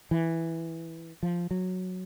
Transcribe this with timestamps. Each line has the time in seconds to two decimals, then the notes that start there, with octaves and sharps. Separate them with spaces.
0.11 E3
1.23 F3
1.51 F#3